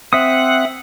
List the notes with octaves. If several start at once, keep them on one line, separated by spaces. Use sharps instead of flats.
C4 E5 F#5 D#6